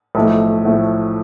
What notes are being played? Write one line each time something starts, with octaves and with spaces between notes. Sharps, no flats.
B1 A2 F3 A3
A2 F3 A3